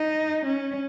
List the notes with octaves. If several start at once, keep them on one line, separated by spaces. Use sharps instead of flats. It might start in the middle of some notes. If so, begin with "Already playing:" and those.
Already playing: D#4
C#4